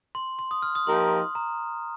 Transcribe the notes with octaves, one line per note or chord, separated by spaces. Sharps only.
C6
C6
D#6
F6
D#6
F3 A#3 D#4 G4 A#4 C6
A#5